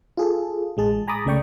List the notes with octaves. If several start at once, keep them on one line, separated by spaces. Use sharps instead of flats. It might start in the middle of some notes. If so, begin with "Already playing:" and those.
F4 G#4 A4
A1 G#3 G#4 A5
G#5 A#5 B5 D6 D#6 A6
C#2 C#3 A3 D5 G5 C#6